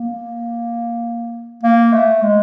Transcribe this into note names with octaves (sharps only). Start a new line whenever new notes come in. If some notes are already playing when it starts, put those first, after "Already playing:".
Already playing: A#3
A#3
A3
G#3